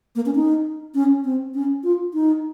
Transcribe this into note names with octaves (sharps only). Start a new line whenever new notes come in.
A#3
C#4
D#4
C#4
C4
C#4
F4
D#4